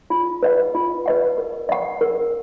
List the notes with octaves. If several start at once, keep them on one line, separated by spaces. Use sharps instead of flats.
F4
B4 D#5 F#5
F4
B4 D#5 F#5
A#4
D#5 F#5
A#4